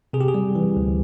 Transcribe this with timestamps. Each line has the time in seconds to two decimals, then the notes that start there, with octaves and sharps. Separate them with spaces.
0.13 C3 G#4
0.21 G4
0.28 G#4
0.34 G3
0.55 E3
0.77 D2